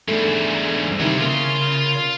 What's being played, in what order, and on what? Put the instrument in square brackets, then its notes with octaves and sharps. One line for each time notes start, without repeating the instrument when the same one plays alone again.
[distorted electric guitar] E2 G#2 [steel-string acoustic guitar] A3 [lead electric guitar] D4 G#4
[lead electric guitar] E2 C4 [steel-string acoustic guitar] G2 D4
[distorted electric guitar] F2 G#3 [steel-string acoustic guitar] C3 D#3 [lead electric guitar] G3 E4
[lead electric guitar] C#3 [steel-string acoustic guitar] A#3 [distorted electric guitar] F4 C6